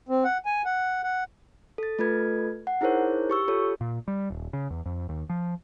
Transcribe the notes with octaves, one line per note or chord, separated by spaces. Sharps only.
C4
F#5
G#5
F#5
F#5
A4 A6
A3 F4 A4 B4 G#6
F#5
D#4 E4 G#4 A#4 C5 C#5
G4 C#6 E6
F4 G4 A4 C#5
A#2
G3
D#1
C#3
E2
F2
D#2
F3